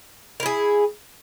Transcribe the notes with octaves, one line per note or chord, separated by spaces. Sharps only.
E4 G#4 A#4